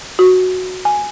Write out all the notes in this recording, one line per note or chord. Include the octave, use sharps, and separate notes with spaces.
F#4
G#5